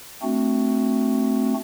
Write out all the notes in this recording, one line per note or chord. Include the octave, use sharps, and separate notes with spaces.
A3 C4 D4 F#4